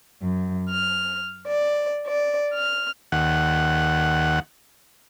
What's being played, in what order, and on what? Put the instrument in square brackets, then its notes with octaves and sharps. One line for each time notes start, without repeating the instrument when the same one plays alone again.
[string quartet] F#2
F6
D5
D5
F6
[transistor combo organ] D#2 F#5